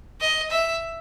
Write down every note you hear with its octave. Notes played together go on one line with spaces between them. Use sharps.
D#5
E5